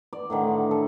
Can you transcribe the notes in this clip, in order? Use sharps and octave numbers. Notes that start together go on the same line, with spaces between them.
D5
A2 D3 D#3
A4